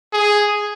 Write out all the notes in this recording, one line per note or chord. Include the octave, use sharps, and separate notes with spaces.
G#4